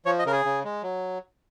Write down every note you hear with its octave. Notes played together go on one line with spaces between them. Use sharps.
F3 C#5
D#5
C#3 A#4
G#4
C#3
G#3
F#3